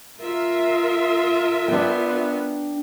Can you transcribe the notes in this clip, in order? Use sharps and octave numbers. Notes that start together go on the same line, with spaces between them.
F4 A#4 E5
B3 D4 G5